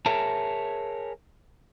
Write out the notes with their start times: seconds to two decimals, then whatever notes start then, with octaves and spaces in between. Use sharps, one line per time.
0.06 G#4 A#4 C#5 E5 A5